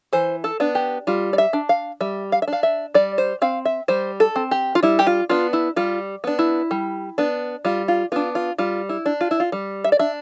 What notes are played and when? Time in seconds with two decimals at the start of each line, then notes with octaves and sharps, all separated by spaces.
0.13 E3 C5
0.44 A4
0.60 B3 D4
0.75 G4
1.07 G3 F4
1.33 D5
1.38 E5
1.53 D4
1.69 F5
2.01 G3 E5
2.32 F5
2.42 E5
2.48 D4
2.53 F5
2.63 E5
2.94 G3 D5
3.18 C5
3.42 C4 F5
3.65 E5
3.88 G3 C5
4.20 A4
4.36 C4
4.51 G4
4.75 F4
4.83 G3 E4
4.99 G4
5.07 F4
5.29 B3 D4 F4
5.53 E4
5.76 G3 F4
6.24 B3 D4
6.39 E4
6.71 G3
7.18 B3 D4
7.65 G3 F4
7.88 F4
8.12 B3 D4 F4
8.35 F4
8.58 G3 F4
8.89 E4
9.06 D4
9.21 F4
9.31 E4
9.40 F4
9.52 G3
9.84 E5
9.92 D5
9.99 D4 E5